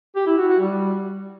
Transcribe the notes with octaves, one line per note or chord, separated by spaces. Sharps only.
G4
E4
F#4
F#4
G3